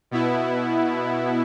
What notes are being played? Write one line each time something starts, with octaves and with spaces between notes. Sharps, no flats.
B2 B3 E4